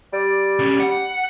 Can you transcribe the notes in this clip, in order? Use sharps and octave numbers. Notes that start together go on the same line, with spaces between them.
G3 D5
D2 C#4
F#5